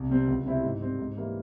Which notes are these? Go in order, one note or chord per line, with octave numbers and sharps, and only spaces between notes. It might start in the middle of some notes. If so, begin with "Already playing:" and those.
Already playing: C2
C3 G3 C4
C#2
C3 G3 C4 E4
G#2
G3 C4
G#2
E3 G3 A#3 E4